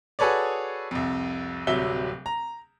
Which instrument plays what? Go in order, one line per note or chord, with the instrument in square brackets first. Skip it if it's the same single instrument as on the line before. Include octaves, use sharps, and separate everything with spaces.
[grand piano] F#4 G#4 A4 B4 C#5 D5
C2 F2
D1 C3 F#3 G3 E5 G7
A#5